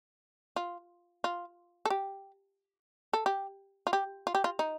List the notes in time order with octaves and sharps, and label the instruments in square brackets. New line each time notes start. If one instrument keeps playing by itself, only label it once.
[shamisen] F4
F4
A4
G4
A4
G4
F4
G4
F4
G4
F4
D#4